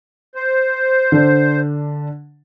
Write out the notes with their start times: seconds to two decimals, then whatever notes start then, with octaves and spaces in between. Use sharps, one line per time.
0.35 C5
1.12 D3 D4